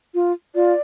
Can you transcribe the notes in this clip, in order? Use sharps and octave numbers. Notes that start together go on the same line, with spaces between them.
F4
F4 D5